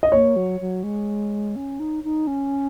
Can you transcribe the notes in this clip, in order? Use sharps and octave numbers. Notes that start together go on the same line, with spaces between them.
D#5
A#3 C#5
F#3
F#3
G#3
C#4
D#4
D#4
C#4